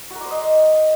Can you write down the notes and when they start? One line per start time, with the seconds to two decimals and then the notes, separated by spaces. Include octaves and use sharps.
0.10 F#4
0.15 A#4
0.20 D5
0.26 C5
0.31 D#5